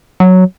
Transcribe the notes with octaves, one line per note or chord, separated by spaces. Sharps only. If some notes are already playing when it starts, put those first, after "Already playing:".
F#3